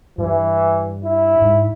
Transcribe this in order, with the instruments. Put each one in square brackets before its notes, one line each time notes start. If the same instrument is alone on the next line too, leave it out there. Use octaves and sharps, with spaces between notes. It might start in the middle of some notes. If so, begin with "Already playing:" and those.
[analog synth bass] G2 [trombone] E3
[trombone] E4
[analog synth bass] G#2